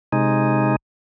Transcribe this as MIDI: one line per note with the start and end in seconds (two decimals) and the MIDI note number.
0.13 0.76 48
0.13 0.76 56
0.13 0.76 63